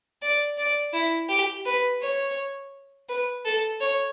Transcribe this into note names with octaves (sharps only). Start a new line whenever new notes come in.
D5
D5
E4
G4
B4
C#5
B4
A4
C#5